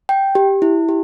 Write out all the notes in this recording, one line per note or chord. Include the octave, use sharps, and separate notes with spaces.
G5
G4
E4
G4